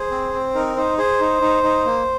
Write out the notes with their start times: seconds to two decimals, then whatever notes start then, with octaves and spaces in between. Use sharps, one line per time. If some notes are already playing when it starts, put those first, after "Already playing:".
Already playing: G#4 C5
0.11 C4
0.33 C4
0.55 D#4 A#4
0.76 D#4 C5
0.98 G#4 C5
1.20 D#4
1.41 D#4
1.63 D#4
1.85 A#3